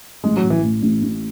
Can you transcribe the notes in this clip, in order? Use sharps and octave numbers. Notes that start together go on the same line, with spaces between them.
A1 G#3
F#3
A2
E3
A2
A1
A1